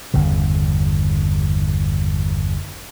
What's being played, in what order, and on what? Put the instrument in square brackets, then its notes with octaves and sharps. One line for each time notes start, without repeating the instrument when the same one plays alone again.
[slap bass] G1 E2 C#3